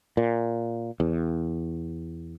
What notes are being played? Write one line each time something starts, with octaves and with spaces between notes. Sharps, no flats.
A#2
E2